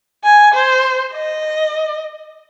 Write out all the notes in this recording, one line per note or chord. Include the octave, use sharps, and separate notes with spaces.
G#5
C5
D#5